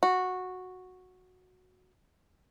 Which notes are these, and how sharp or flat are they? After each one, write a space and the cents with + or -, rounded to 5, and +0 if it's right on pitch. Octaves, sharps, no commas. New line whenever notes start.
F#4 -10